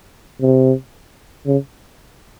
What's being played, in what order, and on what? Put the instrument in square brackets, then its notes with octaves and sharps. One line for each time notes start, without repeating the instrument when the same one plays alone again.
[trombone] C3
C#3